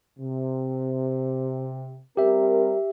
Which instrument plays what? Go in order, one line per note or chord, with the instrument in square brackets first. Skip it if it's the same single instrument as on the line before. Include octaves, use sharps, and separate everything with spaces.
[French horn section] C3
[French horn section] G3 C4 A#4 [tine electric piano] G4 E5